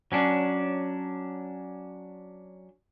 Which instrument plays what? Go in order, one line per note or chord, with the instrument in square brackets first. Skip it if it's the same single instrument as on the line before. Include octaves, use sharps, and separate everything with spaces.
[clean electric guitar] F#3 C#4 D4